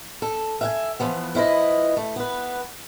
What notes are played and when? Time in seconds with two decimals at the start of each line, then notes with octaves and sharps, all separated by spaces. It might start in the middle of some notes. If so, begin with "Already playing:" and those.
0.22 A4
0.61 E5 F#5 G#5
1.00 E3 F3 B3
1.35 F3 E4 B4 D#5
1.97 A3
2.16 B3 B4